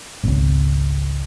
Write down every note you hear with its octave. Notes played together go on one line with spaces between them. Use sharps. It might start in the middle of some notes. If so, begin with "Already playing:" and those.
G#1 C#2